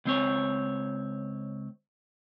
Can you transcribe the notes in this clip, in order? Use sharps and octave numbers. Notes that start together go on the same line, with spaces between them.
C#2 C4 C#5